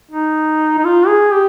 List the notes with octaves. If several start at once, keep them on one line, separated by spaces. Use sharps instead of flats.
D#4
D#4
F4
G#4
G4